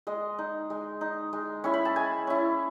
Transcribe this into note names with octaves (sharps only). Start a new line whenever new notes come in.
G#3 D#5
D#4
G#3
D#4
G#3
C#4 E4 C#6
B5
A5
G#3 G#5
C#4 E4